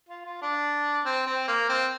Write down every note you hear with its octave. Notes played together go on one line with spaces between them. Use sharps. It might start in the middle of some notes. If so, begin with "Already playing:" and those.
F4
F4
D4
C4
C4
A#3
C4